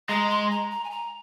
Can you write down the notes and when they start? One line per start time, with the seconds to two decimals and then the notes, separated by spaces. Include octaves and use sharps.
0.09 G#3 A#5
0.30 C6
0.51 A#5
0.71 A#5
0.84 G#5
0.90 A#5